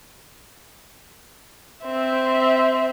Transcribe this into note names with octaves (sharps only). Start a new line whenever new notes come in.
C4 E5